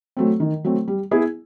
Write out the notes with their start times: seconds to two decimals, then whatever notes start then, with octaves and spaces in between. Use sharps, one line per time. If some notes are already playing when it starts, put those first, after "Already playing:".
0.17 F#3 A3 C4
0.40 D#3
0.64 F#3 A3 C4
0.88 G3
1.11 B3 E4 G#4